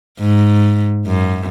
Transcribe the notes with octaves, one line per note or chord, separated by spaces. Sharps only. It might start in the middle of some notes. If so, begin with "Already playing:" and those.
G#2
F#2